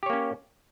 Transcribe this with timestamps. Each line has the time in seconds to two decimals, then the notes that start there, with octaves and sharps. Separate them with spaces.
0.03 G4
0.06 C#5
0.10 A#3
0.13 C#4